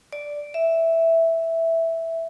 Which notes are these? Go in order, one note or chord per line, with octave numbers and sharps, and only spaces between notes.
D5
E5